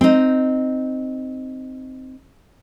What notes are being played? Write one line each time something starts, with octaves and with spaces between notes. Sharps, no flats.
C4 D#4